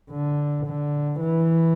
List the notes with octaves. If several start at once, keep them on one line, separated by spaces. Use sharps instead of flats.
D3
D3
E3